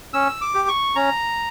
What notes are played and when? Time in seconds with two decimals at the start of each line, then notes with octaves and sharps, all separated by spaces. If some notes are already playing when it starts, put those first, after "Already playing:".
0.13 C#4 E6
0.41 D6
0.54 G4
0.68 C#6
0.95 C#4 A#5